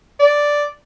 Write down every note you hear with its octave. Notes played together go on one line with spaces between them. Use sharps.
D5